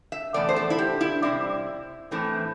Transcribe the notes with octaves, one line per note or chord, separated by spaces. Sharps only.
E5
E2 C3 A3 D5
C5
A4
E4
G4
E4
C3 G3 C4 E4
A2 E3 A3 C4